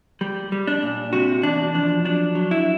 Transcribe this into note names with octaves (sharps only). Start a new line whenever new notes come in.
G3
G3
D4
A#2
C3 F#4
E2 D4
F3 D4
F#3 D4
F#3
E4